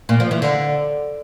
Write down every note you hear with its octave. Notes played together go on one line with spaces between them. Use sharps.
A#2
F3
E3
D3